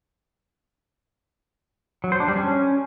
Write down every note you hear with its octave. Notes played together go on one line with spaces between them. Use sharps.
F#3
C5
D4
G3
C#4